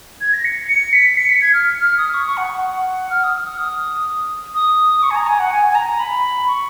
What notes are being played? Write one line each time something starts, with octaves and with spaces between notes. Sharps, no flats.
G#6
A#6
C#7
C#7
B6
C#7
B6
G#6
F6
F6
D#6
C#6
C#6
F#5
F#5
F6
D#6
F6
D#6
D#6
C#6
G#5
A#5
G#5
F#5
G#5
G#5
A#5
B5
C#6